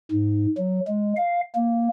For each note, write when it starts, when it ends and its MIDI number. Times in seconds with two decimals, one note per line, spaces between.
0.12 0.46 44
0.57 0.80 54
0.88 1.13 56
1.17 1.41 77
1.55 1.88 58